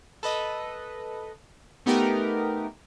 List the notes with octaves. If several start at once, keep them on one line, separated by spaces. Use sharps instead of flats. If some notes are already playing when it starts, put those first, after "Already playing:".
A4 B4 D#5
A3 B3 D#4 G4 A#4